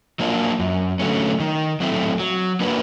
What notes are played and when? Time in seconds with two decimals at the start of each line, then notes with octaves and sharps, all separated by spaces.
0.19 F#3 A#3 D4 F4
0.60 F#2
0.99 D3 F#3 A3 C#4
1.40 D#3
1.80 F#3 A3 C4 E4
2.20 F#3
2.60 A#3 D4 F#4 B4